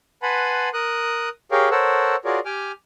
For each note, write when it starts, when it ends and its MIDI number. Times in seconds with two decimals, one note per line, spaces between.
0.23 0.69 71
0.23 0.69 78
0.23 0.69 80
0.23 0.69 81
0.23 0.69 83
0.23 0.69 84
0.74 1.29 70
0.74 1.29 87
0.74 1.29 90
1.52 1.69 67
1.52 1.69 68
1.52 1.69 70
1.52 1.69 73
1.52 1.69 77
1.52 1.69 79
1.71 2.16 69
1.71 2.16 70
1.71 2.16 72
1.71 2.16 73
1.71 2.16 78
1.71 2.16 88
2.25 2.40 65
2.25 2.40 66
2.25 2.40 68
2.25 2.40 70
2.25 2.40 73
2.25 2.40 74
2.45 2.72 67
2.45 2.72 79
2.45 2.72 80
2.45 2.72 86
2.45 2.72 89